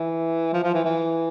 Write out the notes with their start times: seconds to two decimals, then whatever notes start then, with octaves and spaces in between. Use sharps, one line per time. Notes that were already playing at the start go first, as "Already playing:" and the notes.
Already playing: E3
0.53 F3
0.63 F3
0.74 E3
0.85 E3